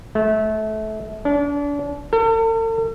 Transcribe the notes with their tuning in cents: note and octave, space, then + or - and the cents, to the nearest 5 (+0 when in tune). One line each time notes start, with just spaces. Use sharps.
A3 -25
D4 -35
A4 +45